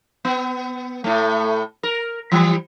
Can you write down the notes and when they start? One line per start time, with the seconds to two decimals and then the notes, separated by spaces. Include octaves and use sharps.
0.25 B3
1.04 A2 A3
1.83 A#4
2.32 E3 G3